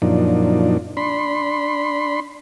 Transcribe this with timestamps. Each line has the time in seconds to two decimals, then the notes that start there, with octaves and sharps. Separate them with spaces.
0.02 F#2 A#2 F3 D4 D#4
0.97 D4 B5 C6